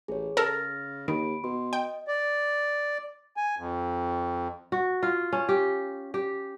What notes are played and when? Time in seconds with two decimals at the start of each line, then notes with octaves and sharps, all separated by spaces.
0.08 A1 G#4 C#5
0.37 C#3 A4 A#4 F6 A6 A#6
1.08 D#2 D#3 B5 D7
1.44 B2 C6
1.73 D#5 G5
2.08 D5
3.37 G#5
3.58 F2
4.72 F#4
5.03 F4
5.33 C#4
5.49 G4
6.14 G4